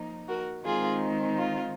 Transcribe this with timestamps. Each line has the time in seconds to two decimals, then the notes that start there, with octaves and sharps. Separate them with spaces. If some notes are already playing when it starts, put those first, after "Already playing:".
Already playing: F3 A#3 D#4
0.28 F#4 A#4
0.64 D#3 G#3 C4 D#4 F4 G#4
1.38 F4